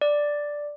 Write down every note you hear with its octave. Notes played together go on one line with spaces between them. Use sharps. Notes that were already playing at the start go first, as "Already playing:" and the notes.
D5